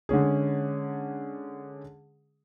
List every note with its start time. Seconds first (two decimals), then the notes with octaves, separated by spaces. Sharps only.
0.09 D3 G#3 C#4 G#4